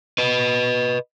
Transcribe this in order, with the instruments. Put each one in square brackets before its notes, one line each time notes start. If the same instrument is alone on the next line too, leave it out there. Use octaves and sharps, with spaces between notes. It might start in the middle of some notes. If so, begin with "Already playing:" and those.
[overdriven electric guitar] B4 D#5